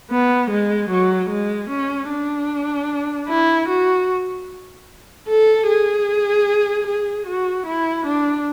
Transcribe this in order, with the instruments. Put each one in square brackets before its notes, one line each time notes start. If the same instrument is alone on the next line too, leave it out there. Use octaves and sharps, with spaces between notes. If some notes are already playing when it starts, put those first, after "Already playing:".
[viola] B3
G#3
F#3
G#3
C#4
D4
E4
F#4
A4
G#4
G#4
F#4
E4
D4